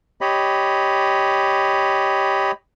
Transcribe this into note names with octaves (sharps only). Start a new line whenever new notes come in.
G4 C#5 D#5 B5